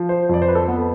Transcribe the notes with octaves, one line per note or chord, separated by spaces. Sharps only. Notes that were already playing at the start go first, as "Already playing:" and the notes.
Already playing: F3
C5
F2 D5
C5
B4
A4
B3